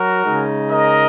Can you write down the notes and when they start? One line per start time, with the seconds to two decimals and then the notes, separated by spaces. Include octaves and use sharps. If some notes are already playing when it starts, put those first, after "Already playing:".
Already playing: F#3 F#4 A#4
0.25 C#3 G#3 D#4
0.71 A#4 D#5